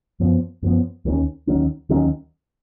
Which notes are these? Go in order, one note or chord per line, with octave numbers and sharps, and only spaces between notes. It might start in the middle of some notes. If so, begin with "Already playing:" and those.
F#2 F3 B3
F#2 F3 B3
D#2 D#3 F#3 C#4
D#2 D#3 F#3 C#4
D#2 D#3 F#3 C#4